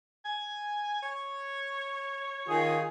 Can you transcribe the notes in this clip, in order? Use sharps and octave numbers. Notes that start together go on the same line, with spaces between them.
G#5
C#5
D#3 F4 G#4